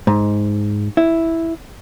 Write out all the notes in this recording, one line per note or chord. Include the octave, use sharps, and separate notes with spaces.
G#2
E4